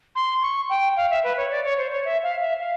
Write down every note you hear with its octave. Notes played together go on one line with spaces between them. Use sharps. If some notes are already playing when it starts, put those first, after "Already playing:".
C6
C#6
G5
F5
E5
B4
C#5
D5
C#5
C5
C#5
E5
F5
E5
F5